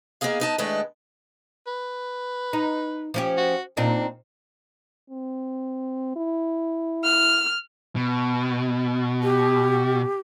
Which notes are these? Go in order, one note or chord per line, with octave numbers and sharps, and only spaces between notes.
A#3 B3 D#4 G#4 F5
B3 D#4 A5
D#3 G#3 A3 D4 E4 B4
B4
D#4
F3 C#4 G4
F#4
A#2 C4 D4 D#4
C4
E4
F6
B2
G4